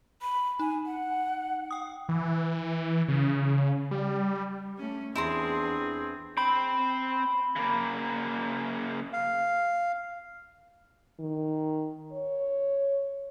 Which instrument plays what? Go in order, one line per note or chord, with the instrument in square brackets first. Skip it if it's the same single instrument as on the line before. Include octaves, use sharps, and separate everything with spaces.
[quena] B5
[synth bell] D#4 [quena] G#5
[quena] F#5
[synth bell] G5 D#6
[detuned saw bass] E3
C#3
G3
[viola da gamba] A3 C#4
[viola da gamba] E2 D4 [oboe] C4 [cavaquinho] E4 A#5 C6 [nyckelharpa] G#4
[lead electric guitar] C4 G5 [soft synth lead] B5
[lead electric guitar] C#3 A#3
[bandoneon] F5
[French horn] D#3
C#5